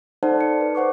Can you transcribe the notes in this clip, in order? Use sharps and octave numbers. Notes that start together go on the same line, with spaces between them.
D#4 A4 C5 D5 F#5 A5
C#7
B4
C5 F#5 C#6 D6